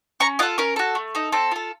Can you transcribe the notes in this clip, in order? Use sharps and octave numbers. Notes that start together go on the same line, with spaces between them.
C#4 A#5 C#6
F4 A4 D#5 F#5
C#4 A#4
F#4 A4
A3
D#4 A4
C4 A4
F4 A4